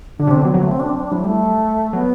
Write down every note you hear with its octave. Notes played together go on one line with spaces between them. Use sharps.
D3 D4
C3
C4
D3
F#3 B3
F#3 B3
A3
C4
D4
C4
D4
F#3 E4
G3 A3
F#3 B3